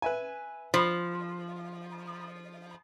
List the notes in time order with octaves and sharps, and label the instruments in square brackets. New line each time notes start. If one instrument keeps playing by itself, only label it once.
[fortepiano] B4 E5 G#5
[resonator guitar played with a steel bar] F3 [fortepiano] C5 B5